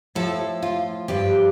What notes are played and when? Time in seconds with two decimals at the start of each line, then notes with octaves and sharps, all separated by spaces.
0.15 A2 F3 A4
0.62 F4
1.08 G2 F3 G4